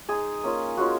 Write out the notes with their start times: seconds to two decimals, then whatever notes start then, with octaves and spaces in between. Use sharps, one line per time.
0.08 G#3 D#4 G#4
0.43 A#3 C#4 F4
0.77 G#3 C#4 F4 F#4